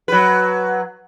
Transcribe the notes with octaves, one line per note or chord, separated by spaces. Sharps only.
F#3 B4